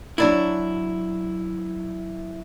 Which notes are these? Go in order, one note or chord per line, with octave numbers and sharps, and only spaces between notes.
F#3 D4 E4